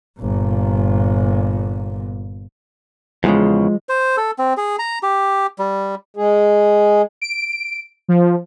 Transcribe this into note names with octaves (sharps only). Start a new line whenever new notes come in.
G1 A#2
E2 A#2 C#3 F3 G#3
C5
A4
C4
G#4
A#5
G4
G3
G#3 G#4
D7
F3